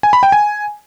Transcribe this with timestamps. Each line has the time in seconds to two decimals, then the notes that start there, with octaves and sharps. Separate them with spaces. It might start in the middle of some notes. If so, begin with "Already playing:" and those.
0.03 G#5
0.13 B5
0.23 G5
0.32 G#5